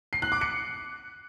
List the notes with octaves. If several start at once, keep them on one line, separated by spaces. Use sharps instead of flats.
C7
F#6
D6
C#7